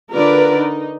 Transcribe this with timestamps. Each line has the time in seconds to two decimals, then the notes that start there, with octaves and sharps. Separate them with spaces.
0.14 D3 F4 A#4 B4 D5
0.58 D#4